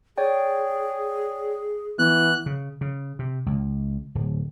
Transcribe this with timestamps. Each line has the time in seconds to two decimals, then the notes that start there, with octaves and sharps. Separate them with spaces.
0.18 G#4 C#5 D5 G5
1.99 E3 B3 F#6
2.46 C#3
2.81 C#3
3.19 C3
3.46 C#2
4.15 D1